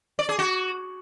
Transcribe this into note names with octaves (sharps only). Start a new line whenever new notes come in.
D5
G#4
F#4